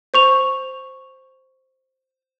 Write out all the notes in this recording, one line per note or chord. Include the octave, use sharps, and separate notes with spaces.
C5 C#6 F7